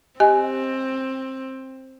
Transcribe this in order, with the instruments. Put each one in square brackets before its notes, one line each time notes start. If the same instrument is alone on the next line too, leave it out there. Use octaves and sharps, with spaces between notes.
[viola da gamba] C4 [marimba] G4 D#5 G#5